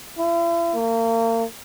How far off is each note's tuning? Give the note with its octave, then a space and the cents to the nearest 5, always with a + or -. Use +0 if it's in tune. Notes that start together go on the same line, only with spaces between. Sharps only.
E4 +45
A#3 -35